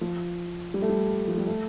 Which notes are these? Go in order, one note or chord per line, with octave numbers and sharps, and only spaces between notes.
F3
G3
A3
G3
F3
G3
A3